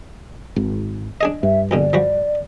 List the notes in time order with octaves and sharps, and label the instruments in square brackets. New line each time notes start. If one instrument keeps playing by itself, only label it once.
[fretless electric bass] G#1
[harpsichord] D4 G#4 D#5
[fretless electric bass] G2 [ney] E5
[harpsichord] A#1 B2 D3 [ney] D5
[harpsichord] F3 G3 F#4